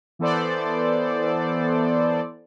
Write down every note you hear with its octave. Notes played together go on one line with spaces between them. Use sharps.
E3 B3 A4 C5 D5